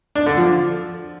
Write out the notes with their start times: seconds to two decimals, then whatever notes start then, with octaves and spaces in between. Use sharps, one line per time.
0.15 D4
0.26 D3
0.37 F3